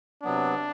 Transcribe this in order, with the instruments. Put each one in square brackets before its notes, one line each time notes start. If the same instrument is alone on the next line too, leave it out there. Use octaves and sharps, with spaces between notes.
[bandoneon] C3 F#3 B3 [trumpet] D4